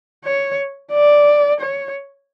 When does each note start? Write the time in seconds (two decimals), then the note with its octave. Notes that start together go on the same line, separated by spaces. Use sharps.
0.24 C#5
0.92 D5
1.60 C#5